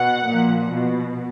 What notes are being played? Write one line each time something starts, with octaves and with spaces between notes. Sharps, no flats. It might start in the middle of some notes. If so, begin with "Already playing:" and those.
Already playing: B2 F#5
A#2 F3
B2